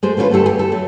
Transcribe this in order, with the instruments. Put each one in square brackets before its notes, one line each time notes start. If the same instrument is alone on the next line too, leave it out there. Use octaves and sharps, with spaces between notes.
[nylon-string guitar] G#3 A3 C5
D3 A3 C#4 D4 F4 B4
D3 G3 A3 A4
G4 G#4
A4
F#3 A3